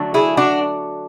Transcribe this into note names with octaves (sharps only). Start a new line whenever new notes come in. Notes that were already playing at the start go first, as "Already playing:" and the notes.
Already playing: D3 F#3 A3 D4
E4 G#4
D4 F#4